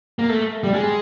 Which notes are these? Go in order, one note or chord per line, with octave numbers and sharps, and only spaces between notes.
A#3
A3
G3
G#3